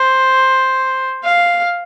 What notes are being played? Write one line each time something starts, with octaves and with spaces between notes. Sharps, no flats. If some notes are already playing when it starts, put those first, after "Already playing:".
Already playing: C5
F5